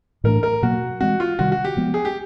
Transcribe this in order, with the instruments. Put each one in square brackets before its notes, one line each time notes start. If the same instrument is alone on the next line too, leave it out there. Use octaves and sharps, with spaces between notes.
[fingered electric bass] A2 E3 A3 D4 [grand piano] A#4
[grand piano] A#4
[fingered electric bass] B2 F#3 A#3 [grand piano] F#4
[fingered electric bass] E3 G#3 C4 [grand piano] F#4
[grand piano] F4
[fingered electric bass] C3 D#3 G3 [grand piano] F#4
[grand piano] F#4
G4
[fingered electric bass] F3 G#3 B3
[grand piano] G#4
G4